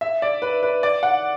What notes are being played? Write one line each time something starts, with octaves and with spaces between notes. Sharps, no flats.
E5
D5
B4
B4
D5
F#5